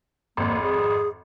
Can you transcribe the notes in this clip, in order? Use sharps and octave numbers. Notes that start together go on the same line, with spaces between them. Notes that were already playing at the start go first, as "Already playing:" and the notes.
G#1 F2 A#3
G#4